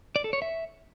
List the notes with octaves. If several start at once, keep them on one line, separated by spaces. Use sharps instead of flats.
D5
A4
C#5
E5